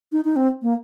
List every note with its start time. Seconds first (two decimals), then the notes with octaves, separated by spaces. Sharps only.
0.12 D#4
0.25 D#4
0.36 C4
0.62 A#3